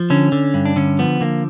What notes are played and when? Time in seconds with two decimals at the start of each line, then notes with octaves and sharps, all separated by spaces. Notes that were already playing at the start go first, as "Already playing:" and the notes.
Already playing: F3
0.10 D3 C#4
0.32 D3
0.54 G2
0.65 D4
0.76 D3 C#4
0.99 F3 B3
1.21 D3 A#3